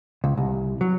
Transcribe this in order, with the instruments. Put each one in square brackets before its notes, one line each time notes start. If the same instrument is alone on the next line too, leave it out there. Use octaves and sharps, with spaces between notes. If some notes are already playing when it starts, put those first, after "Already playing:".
[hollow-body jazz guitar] C#2
C2
F#3